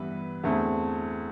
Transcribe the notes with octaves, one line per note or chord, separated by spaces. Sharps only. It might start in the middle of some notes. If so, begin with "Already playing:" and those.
Already playing: G2 E3 B3 E4 B4
E2 D3 A3 C4